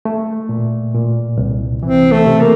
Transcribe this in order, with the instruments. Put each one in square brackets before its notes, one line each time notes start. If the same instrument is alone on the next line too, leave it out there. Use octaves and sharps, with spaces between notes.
[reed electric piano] A3
A#2
A#2
C2
[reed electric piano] E3 [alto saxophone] C4
[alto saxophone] A3
[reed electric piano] C3
[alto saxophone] A#3